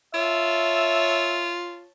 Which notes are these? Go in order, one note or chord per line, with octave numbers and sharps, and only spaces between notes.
F4 C#5 E5 A5